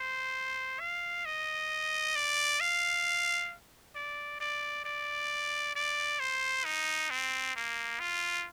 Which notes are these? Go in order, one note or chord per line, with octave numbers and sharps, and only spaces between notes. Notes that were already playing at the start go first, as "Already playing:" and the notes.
Already playing: C5
F5
D#5
D5
F5
D5
D5
D5
D5
C5
D#4
C4
A#3
F4